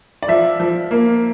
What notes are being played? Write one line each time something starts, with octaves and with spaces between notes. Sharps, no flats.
D5
F3 E5
F3
A#3